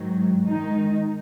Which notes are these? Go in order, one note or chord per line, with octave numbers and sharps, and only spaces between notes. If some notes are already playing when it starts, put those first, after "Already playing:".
Already playing: G#2 D#3 F#3
D#3 G#3 D#4